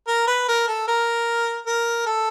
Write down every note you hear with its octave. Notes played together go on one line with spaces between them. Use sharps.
A#4
B4
A#4
A4
A#4
A#4
A4